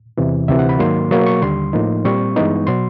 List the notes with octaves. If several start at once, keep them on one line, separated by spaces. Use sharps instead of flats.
E2 C3 E3
D2 C3 E3 E5
F#5
B5
G#2 D#3 F#3 A#3 C6
B2 F#3 A#3 C#6
C#6
D#2 D3 G3 C6
A2 F3 A#3 D#4
A#2 G3 C4 C#6
G2 E3 G#3 B3 D#4
B2 F#3 C6